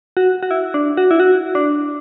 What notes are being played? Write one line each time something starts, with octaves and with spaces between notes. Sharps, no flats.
F#4
F#4
E4
D4
F#4
E4
F#4
D4